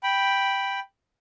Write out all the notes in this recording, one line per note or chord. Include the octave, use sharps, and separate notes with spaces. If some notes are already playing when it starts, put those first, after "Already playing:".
G5 B5